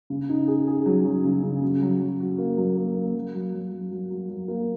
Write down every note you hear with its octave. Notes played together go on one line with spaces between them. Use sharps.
C#3
D#4
G#4
G#4
F#3
F#3
C#3
C#3
F#3
F#3
F#3
F#4
A#3
F#3
A#3
A#3
F#3
F#3
F#3
F#3
F#3
F#3
F#3
A#3